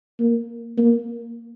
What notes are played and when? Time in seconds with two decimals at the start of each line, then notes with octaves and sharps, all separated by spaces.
0.20 A#3
0.77 A#3